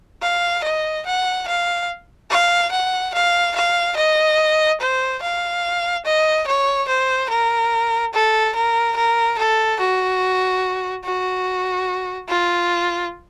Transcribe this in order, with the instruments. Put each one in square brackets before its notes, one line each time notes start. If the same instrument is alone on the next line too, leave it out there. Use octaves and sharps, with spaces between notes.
[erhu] F5
D#5
F#5
F5
F5
F#5
F5
F5
D#5
C5
F5
D#5
C#5
C5
A#4
A4
A#4
A#4
A4
F#4
F#4
F4